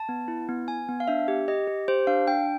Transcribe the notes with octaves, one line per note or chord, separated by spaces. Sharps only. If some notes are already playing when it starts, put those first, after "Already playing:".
Already playing: A5
B3
E4
B3
B3 G#5
B3
F5
D4 E5
G4
G4 D#5
G4
G4 C5
D4 F5
D4 G5